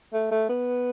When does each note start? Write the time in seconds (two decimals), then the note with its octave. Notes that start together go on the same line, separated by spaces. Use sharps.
0.13 A3
0.31 A3
0.49 B3